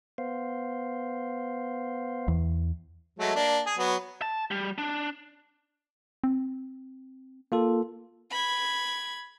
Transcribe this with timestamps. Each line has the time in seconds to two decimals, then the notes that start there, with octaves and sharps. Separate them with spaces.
0.18 B3 C5 F5
2.28 E2
3.19 F#3 G#3 A3
3.35 A#3 D4
3.66 G#4
3.78 F#3 B3
4.22 A5
4.51 G3
4.78 D4
6.24 C4
7.52 A#3 F4 A4
8.31 B5 G#6